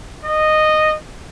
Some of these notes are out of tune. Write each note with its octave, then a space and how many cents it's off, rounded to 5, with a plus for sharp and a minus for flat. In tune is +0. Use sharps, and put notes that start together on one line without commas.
D#5 -10